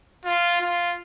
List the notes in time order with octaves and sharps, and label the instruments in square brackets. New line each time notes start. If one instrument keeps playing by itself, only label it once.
[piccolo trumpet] F4
F4